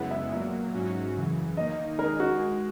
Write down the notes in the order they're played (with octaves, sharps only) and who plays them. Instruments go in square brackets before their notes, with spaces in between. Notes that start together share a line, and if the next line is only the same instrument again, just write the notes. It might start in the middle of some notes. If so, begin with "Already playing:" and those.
Already playing: [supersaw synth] F#2 C#3 G#3 B3 E4 [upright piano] F#5
[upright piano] E5
[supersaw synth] A#2 F#3 A#3 [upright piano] E5
[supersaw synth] G#2 F#3 C#4 F#4
F#2 C#3 E3
[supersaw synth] D#3 A#3 D#4 [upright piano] D#5
[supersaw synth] D#3 G#3 D#4 G#4 [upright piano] A#4
[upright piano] F#4
[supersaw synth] G#3